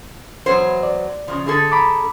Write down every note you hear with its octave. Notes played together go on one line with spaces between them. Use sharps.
E2 F#3 C5
D5
C#3 F3
D3 G#4 A4
A#5 B5 D6